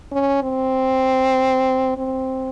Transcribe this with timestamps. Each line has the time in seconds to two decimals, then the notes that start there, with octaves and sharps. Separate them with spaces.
0.12 C#4
0.43 C4
1.98 C4